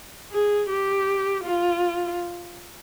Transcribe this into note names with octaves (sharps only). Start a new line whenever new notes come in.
G#4
G4
F4